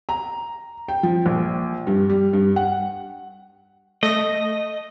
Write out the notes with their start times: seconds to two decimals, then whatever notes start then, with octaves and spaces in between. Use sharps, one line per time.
0.09 A#5
0.88 G5
1.03 F3
1.26 A#1
1.87 G2
2.10 G3
2.33 G2
2.56 F#5
4.03 A3 D#5 A#6